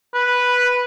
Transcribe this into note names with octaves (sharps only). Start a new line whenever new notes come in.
B4